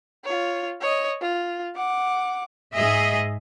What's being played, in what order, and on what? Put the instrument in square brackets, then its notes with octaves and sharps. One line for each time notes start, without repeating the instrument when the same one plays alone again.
[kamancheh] F4 C#5
C#5 D#5
F4
F#5 D6
[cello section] G#2 G#4 D#5 E5